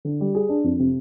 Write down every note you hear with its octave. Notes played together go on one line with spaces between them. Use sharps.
D3
G3
G#4
D4
F2
C3